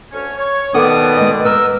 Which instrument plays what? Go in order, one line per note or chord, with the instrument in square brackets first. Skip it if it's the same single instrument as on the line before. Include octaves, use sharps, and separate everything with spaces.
[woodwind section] D2 C#4 C#5
C#5
[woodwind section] B2 D5 [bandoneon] D#3 B3 D#6 [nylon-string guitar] A4 A#4 F#5
[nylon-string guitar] G#3 B4 D#5
[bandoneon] A#4 E6 [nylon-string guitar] B4